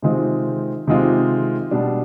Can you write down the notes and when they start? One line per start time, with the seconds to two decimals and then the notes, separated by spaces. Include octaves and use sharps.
0.02 C3 D#3 G#3 C4 F4
0.88 C3 D#3 G#3 C4 F4
1.71 B2 G3 D4